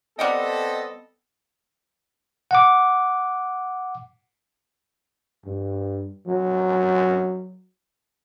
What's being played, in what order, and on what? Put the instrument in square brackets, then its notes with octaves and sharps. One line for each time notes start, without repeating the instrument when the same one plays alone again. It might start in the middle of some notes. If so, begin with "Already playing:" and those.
[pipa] G3 F#5 G5 [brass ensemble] B3 C4 A4 [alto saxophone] D#5
[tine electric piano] F#5 D6
[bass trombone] G2
F#3